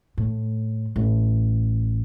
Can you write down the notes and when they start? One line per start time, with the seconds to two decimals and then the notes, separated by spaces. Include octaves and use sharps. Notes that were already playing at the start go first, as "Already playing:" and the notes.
0.18 A2
0.96 A1